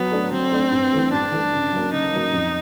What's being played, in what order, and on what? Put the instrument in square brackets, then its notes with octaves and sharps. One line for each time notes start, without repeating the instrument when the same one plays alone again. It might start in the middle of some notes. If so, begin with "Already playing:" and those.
Already playing: [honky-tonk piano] F#3 [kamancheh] B3
[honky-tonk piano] A3 D4
[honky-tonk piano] F#3 [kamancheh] C4
[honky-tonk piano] A3 D4
G2
E3 A3
[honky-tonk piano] G2 [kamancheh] D4
[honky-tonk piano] E3 A3
C#3
F#3 A#3
[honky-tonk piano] C#3 [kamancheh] D#4
[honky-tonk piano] F#3 A#3
F2